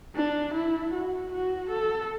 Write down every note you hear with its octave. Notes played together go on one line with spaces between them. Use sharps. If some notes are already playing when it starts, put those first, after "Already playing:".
D4
E4
F#4
F#4
A4